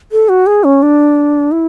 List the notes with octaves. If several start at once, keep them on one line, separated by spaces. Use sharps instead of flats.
A4
F#4
G#4
C#4
D4
E4